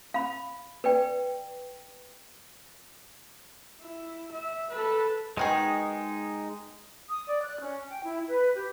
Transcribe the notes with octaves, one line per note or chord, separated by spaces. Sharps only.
F5 B5
B4 D5 G5
E4
E5
A4 B4
B2 D#3 G#3 D#4 G#4
D#6
D5
F#6
C#4
G5
E4
B4
G4